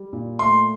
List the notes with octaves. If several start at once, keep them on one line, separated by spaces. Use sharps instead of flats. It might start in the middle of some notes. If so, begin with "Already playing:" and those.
Already playing: G3
A#2
A3 C6